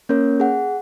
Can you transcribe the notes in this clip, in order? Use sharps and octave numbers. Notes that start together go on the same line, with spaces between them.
A#3 C#4 A#4 C#5
G#4 F#5